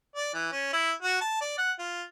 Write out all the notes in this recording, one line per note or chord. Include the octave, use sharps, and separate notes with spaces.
D5
E3
C#4
E4
F#4
A5
D5
F#5
F4